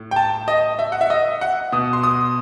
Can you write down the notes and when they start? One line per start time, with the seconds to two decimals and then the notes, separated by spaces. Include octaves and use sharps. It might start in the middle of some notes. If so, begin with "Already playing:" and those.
Already playing: A2
0.11 G5
0.16 A5
0.48 D#5
0.79 E5
0.92 F#5
1.01 E5
1.10 D#5
1.41 F#5
1.72 B2 D#6
1.93 C6
2.04 D#6